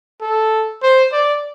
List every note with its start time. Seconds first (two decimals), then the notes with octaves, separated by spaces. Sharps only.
0.21 A4
0.82 C5
1.12 D5